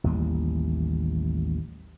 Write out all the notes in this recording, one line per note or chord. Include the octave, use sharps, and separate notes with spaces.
A1 D#2 G3